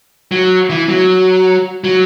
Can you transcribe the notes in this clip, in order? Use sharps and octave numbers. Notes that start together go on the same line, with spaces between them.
F#3
E3
F#3
F#3